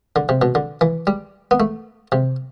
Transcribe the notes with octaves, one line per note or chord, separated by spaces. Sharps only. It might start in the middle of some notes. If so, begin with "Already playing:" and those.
D3
C3
B2
D3
E3
G3
B3
A3
C3